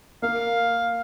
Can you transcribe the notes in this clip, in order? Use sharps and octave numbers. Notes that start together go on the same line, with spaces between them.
A#3 F5